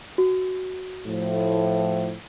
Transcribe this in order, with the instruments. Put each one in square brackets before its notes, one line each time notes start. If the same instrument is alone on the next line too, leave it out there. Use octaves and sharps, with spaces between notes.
[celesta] F#4
[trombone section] A2 F3